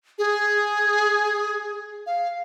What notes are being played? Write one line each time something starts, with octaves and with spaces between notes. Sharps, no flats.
G#4
F5